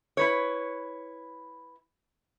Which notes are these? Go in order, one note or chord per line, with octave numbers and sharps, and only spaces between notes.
E4 B4 C#5